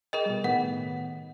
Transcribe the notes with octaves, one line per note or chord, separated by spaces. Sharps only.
G#4 A#4 D#5 G5
B2 G3
A2 D#3 B3 F#5